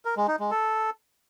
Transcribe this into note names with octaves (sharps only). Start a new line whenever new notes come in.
A#4
G#3
D#4
G#3
A4